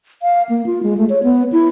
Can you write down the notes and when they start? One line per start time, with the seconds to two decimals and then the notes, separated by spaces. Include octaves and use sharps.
0.22 F5
0.49 A#3
0.66 F4
0.83 G#3
0.97 A3
1.10 C#5
1.23 B3
1.52 E4